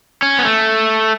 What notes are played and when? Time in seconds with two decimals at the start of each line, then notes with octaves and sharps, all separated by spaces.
0.22 C#4
0.39 B3
0.45 A3